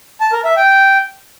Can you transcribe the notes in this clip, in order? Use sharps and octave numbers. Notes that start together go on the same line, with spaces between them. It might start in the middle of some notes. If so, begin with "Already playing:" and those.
A5
A#4
E5
G5